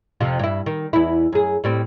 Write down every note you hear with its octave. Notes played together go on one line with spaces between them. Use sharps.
F2 C3 F3
G2 E4
D#3
E2 E4
F#2 G#4
A2 G3 C4